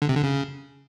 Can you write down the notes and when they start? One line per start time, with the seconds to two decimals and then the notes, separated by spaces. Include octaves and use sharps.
0.02 D3
0.09 C3
0.16 D3
0.23 C#3